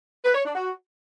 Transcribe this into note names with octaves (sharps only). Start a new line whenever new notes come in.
B4
C#5
D4
F#4